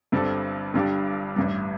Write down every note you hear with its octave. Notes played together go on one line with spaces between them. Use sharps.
G1 G2 G3 C4 A4
G1 G2 G3 D4 G4
A1 G2 G3